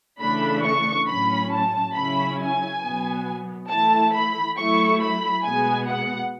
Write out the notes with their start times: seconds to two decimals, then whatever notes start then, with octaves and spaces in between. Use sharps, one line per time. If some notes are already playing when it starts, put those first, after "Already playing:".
0.21 C#3 E3 A3 D4 B5
0.64 C#6
1.08 A2 F#3 C#4 B5
1.52 A5
1.95 C#3 F#3 C#4 E4 B5
2.39 G#5
2.83 B2 F#3 B3
3.70 E3 A3 E4 A5
4.14 B5
4.57 F#3 A3 E4 C#6
5.01 B5
5.44 B2 G#3 B3 G#5
5.88 F#5